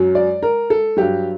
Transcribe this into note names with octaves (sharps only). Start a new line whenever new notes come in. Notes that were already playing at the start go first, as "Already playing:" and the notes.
Already playing: F#2 F#3
D5
A#4
A4
G2 F#3 G4